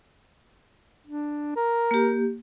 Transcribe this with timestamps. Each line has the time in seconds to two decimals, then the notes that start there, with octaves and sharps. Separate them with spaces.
1.07 D4
1.56 A#4
1.91 A#3 G4